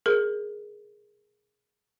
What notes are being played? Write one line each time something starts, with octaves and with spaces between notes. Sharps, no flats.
G#4 A#4